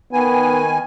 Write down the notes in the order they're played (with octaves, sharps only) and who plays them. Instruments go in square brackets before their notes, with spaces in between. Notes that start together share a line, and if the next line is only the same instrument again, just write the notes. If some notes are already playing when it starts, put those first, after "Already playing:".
[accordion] D#3 G#5 [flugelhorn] B3